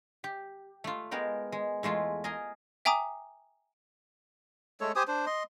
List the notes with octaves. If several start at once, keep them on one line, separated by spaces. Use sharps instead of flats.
G4
A3 F4
G#3 B3 A#4 G5
G#3
E2 G#3 A3 F4
G#4 A#4 D#5
E5 G5 G#5 A#5 D6 D#6
G#3 A3 A4 C#5
G4 C5 G#5 D#6
D4 C5
D#5 C6